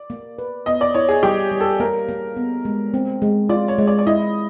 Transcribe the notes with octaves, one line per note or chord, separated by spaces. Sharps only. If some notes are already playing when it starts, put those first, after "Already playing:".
Already playing: D5
A#3
B4
B3 D#5
D5
E4 C#5
G#4
G3 G4
G3
A4
A#3 A#4
A#3
B3
G#3
C4
G#3
F4 D5
C#5
G#3
D5
D5
E4 D#5